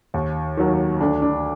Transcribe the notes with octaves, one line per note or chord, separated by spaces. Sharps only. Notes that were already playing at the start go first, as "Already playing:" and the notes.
D#2
D#3 F#3
D2 D4
D4